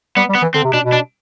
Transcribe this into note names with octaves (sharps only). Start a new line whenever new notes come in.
G3 B3
G3
B3
E3
D3 C4
C3
B2 D4
B2
D4